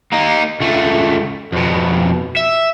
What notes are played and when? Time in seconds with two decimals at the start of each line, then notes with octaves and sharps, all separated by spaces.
0.12 A#3 D#4
0.61 C#2 A3
1.53 F2 B2
2.37 E5